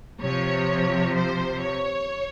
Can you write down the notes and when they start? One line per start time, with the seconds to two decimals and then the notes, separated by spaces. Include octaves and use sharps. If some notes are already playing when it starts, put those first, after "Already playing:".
0.21 C3 F3 C#5
1.14 C5
1.60 C#5